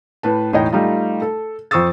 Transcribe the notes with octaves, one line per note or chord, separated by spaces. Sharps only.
A2 B4 A5
E1 A2 D#4 C#5 D#5 G5
G3 A3 D#4 F4
A4
F2 C5 C#6 D#6 E6 A6